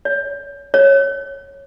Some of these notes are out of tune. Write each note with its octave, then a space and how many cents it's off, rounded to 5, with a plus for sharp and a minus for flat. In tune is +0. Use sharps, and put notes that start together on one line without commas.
C#5 +35
C#5 -5